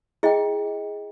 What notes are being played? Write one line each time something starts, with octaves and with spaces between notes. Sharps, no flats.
E4 G#4 D#5 G5